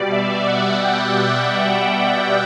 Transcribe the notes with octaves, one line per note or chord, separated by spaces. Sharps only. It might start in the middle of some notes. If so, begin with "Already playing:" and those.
Already playing: B2 G3 D5
E5
F#5
G5
G5